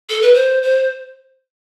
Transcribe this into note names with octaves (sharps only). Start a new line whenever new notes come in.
A4
B4
C5
C5